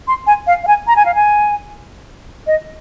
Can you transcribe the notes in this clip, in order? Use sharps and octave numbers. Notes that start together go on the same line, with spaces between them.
C6
G#5
F5
F5
G#5
A#5
G#5
F5
G#5
D#5